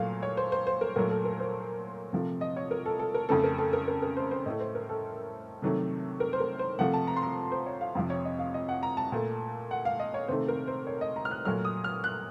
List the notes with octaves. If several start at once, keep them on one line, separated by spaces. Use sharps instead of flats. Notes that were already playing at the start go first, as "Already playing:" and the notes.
Already playing: A#2 F#3 A3 F5
C#5
C5
C5
C5
A#4
A#2 F#3 A3 A#4
A4
A#4
C5
C3 F3 A3
D#5
C#5
A#4
A4
A4
A#4
F2 C#3 A3 A4
A#4
A4
A#4
A#4
A#4
C5
C5
A2 A3 D#5
C5
A#4
A4
C3 D#3 F#3 A3
A#4
C5
A#4
C5
C3 F3 A3 F#5
A5
A#5
C6
A#5
C5
C#5
F5
F2 C3 F3 F5
C#5
D#5
F5
D#5
F#5
A#5
A5
A#2 A3
F#5
F5
D#5
C#5
C3 D#3 A3 C5
A#4
C5
C#5
D#5
A#5
F6
F#6
A#2 F#3 A3 F6
D#6
F6
F#6